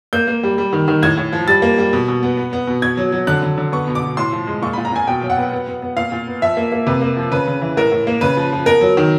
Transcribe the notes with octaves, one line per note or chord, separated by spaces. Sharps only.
A#3 G6
A#3
G3
G3
D#3
D#3
A2 G#6
A2
F3
G3 A6
A#3
G3
B2
B2
B3
B3
B3
B2
B2 G#6
F#3
F#3
D3 F#6
D3
D3
B3 C#6
B2
D6
B2
A2 C6
F3
G#3
A#2 C#6
B5
A#2
A#5
A#2 G#5
B2 G5
F#3
F#5
B3
B3
B3
B3
A#2 F5
A#2
B3
F3 E5
A#3
A#3
C3 B4
A#3
F3
C#3 B4
C#3
E3
A2 A#4
A2
A#3
C#3 B4
F3
F3
B3 A#4
F#3
D#3